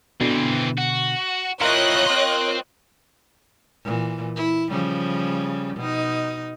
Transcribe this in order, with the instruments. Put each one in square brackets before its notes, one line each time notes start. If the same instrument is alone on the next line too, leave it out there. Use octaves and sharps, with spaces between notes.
[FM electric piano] B2 D3 [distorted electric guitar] E3 C4
[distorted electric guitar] F#4
[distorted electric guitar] C4 E4 [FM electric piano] F4 A#4 F5 [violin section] C#5 D#5 F#6
[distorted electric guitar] C5 G5
[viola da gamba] A#2 E3
E4
C#3 F3 G3
B2 D#4